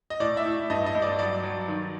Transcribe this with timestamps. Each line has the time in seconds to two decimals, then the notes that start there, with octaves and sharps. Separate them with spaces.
0.10 D#5
0.20 A2 D5
0.37 E5
0.45 A2
0.70 G2 D#5
0.86 D#5
0.95 G2
1.02 D5
1.19 F#3 D5
1.43 F#3
1.68 D#3